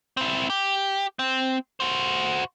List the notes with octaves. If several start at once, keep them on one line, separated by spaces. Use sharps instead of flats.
C4 E4
G4
C4
F#4 C5